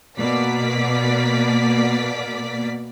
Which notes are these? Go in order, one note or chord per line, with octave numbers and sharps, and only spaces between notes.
B2 A#3 D5 B6